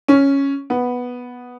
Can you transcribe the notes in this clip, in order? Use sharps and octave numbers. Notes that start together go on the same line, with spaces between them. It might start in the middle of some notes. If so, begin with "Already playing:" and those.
C#4
B3